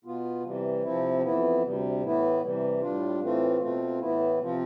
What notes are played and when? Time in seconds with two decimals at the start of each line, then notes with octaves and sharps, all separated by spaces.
0.04 B2 B3 F4
0.43 C3 E3 G3
0.83 C3 F3 C4 E4
1.23 F2 E3 B3 E4
1.62 D2 C3 G3
2.02 A2 E3 B3 E4
2.42 C3 E3 G3
2.81 A2 G3 D4 F4
3.21 A2 E3 A3 C4 F4
3.60 B2 A3 C4 F4
4.00 A2 E3 B3 E4
4.40 C3 F3 C4 F4